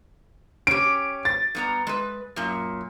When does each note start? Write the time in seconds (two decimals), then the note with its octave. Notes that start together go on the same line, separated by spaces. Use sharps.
0.67 C#4 G4 D7
1.25 A6
1.55 G2 B3 A#5
1.87 G#3 B4
2.36 F#2 A#2